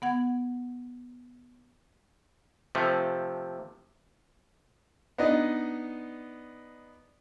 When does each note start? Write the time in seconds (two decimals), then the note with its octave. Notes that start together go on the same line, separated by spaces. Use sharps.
0.02 B3 F#5 G#6
2.75 C3 F3 A3
5.18 B3 D4 D#4 D5 D#5